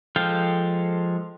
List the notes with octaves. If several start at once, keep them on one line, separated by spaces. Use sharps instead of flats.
F3 G#3 A4 F5 G5